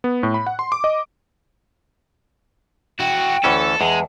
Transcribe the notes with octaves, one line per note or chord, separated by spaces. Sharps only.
B3
A2
B5
F#5
C6
D6
D#5
E4 F#4 G5
D2 E3 C#4 A4
E2 G#3 A5